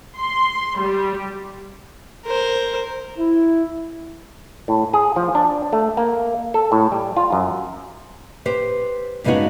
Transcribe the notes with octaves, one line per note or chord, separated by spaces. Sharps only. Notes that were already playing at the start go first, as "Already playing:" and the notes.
C6
G3
A#4 C5
E4
A2
G#4
F3
D4
A3
A#3
A4
A2
G3
F4
F#2
G4 B4 C5
G2 C#3 G#3 B3 D#4 F#4